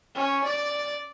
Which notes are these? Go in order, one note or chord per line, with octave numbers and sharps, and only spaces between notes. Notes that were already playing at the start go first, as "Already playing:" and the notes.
C#4
D5